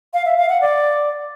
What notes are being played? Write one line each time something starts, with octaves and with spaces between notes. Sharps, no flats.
F5
E5
F5
F#5
D5